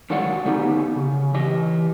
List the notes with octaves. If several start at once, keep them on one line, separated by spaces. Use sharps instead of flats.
D3 D#3 F#3 G#3 D5 F#5
D3 B3 C#4 D#4 G4
C#3
E3 G4 D#5